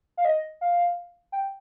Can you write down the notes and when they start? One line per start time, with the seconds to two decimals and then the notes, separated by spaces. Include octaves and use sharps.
0.17 F5
0.25 D#5
0.61 F5
1.32 G5